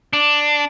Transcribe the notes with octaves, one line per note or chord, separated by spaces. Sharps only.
D4